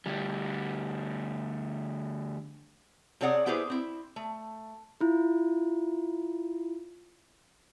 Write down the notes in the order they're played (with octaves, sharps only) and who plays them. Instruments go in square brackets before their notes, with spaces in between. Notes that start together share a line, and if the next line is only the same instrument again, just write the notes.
[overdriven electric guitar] D2 G3
[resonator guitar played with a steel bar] C3 C4 G#4 C#5 D5 F#5
B3 E4 G4 G#4 B4 C5
C4 E4
A3
[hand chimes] E4 F4